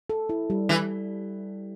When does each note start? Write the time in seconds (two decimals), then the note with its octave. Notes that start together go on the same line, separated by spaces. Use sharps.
0.10 A4
0.29 E4
0.50 G3
0.69 E3 G3